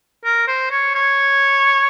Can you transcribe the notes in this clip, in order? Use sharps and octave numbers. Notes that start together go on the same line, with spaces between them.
A#4
C5
C#5
C#5